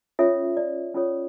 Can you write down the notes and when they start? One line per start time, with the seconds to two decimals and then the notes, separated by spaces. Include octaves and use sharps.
0.19 C#4 F4 A4 C#5 E5
0.57 D5
0.94 C#4 F4 A4 C#5